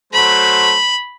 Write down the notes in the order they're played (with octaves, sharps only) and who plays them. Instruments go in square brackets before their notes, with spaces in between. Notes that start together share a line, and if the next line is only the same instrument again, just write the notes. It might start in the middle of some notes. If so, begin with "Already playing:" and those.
[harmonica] F#3 A3 C5 [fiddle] B5